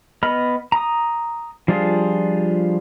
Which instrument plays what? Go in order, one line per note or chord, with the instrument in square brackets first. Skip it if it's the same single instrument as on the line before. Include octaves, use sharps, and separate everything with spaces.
[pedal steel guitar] B3 D#5 B5 F6
A#5 D#6
F3 G3 D4 F4 G#4